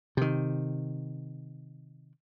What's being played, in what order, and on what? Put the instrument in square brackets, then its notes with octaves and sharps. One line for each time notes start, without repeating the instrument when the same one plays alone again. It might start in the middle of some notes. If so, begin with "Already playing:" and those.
[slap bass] C3 D#3